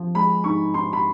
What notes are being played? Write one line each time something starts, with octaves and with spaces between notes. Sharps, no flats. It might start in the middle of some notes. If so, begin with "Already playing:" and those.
Already playing: F3
G#3 B5
G#2 C#6
G#2 C6
B5